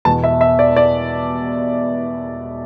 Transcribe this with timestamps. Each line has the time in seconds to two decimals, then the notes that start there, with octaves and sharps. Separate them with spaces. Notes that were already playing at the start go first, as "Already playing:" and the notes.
0.05 E2 B2 A5
0.24 E5
0.41 E5
0.59 D5
0.76 D5